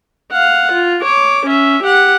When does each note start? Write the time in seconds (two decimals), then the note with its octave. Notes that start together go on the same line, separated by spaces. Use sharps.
0.32 F5 F#5
0.72 F4
1.03 C#5 D6
1.46 C#4 E5
1.83 G4 F#5